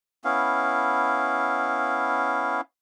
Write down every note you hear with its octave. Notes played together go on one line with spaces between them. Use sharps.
B3 C#4 E4 F5